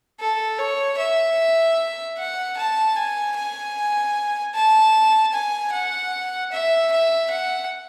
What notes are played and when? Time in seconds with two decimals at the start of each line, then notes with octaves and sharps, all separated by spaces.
0.20 A4
0.59 C#5
0.99 E5
2.17 F#5
2.57 A5
2.96 G#5
3.36 G#5
4.55 A5
5.33 G#5
5.72 F#5
6.52 E5
6.92 E5
7.31 F#5